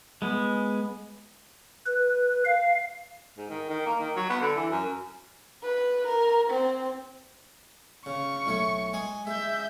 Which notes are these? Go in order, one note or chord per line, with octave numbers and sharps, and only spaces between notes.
G#3 B3
B4
F5
G#2
D#3
D#3
A#3
D#3
F#3
B3
D3
E3
F#2
B4
A#4
C4
C#3 C#6
B1 A3 C#5
G#3 G#4 G#5
G#3 E5 G6